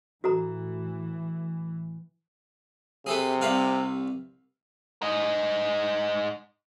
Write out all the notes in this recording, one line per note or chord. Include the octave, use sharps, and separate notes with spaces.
A2 E3 F#4 A4 A#5
C3 G#4 A4 B4
C2 B4 F5
G#2 D#5